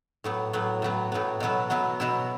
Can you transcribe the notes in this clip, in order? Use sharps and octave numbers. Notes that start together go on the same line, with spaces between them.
A2 F#3 B3
A2 F#3 B3
A2 F#3 B3
A2 F#3 B3
B2 F#3 B3 E4
B2 F#3 B3 E4
B2 F#3 B3 E4